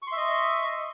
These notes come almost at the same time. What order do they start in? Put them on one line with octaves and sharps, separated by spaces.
C#6 C6 E5 D#5